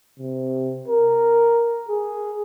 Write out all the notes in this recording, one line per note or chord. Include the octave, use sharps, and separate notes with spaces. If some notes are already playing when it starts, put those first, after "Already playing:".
C3
A#4
G#4